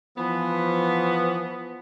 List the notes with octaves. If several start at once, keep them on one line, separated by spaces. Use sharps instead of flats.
E3 F3 B3